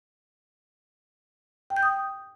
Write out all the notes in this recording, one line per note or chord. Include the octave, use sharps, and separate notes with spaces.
G5
G6
D#6